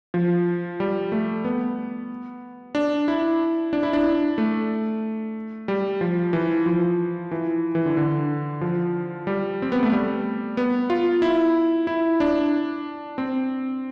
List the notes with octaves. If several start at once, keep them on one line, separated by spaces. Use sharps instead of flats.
F3
G3
A3
B3
D4
E4
D4
E4
D4
A3
G3
F3
E3
F3
E3
E3
D3
D3
F3
G3
C4
B3
A3
G3
B3
F4
E4
E4
D4
C4